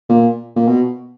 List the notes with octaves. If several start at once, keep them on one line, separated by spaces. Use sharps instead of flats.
A#2
A#2
B2